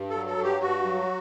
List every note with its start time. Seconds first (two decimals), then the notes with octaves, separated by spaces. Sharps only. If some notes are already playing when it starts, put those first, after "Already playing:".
Already playing: G2
0.09 F#3 A4
0.26 A4
0.37 G2
0.43 G4
0.60 G2 F#4
0.83 F#3